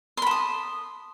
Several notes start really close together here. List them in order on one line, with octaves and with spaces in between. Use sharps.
C6 B5 A5 D#6